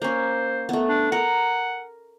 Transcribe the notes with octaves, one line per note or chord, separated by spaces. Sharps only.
A#3 C#4 C5
A3 B3
D4
A#4 F#5